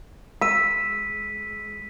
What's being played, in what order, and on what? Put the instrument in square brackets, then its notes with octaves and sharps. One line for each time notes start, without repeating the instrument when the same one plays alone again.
[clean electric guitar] G#3 [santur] E6 [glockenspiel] B6 D#7